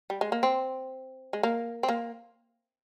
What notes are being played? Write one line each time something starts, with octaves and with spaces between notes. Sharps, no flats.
G3
G#3
A#3
C4
G#3
A#3
C4
A#3